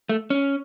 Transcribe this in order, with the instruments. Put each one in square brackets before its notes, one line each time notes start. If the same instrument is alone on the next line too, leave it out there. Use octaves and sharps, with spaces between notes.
[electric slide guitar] A3
C#4